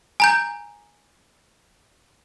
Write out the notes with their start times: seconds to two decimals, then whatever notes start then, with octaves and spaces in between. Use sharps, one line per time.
0.20 G#5 A#5 G6